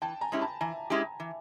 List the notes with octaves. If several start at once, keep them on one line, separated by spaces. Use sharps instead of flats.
E3 G5 A5
G#5 A#5
G#3 C#4 E4 G4
A5 B5
E3 G#5 A#5
G#3 C#4 E4 G4
E3